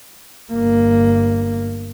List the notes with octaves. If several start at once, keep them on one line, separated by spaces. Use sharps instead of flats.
G1 A#3